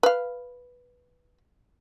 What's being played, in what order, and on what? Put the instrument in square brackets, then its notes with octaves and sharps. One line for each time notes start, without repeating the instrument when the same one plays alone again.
[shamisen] B4 F5